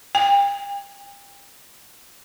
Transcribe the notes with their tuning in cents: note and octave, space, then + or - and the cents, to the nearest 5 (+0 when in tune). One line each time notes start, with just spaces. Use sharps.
G5 +40